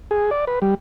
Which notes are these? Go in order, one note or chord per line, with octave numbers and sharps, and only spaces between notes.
G#4
D5
B4
G3